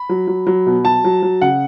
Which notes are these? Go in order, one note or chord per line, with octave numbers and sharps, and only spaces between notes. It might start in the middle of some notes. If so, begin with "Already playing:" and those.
Already playing: B5
F#3
F#3
F#3
B2
F#3 A5
F#3
F#3
C#3 F#5